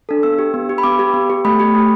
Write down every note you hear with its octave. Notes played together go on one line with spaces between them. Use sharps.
D4 A4
B3 E6
G4
B3
G4
B5
B3 D6
G4
B3
G4
A3 B5
G4
A3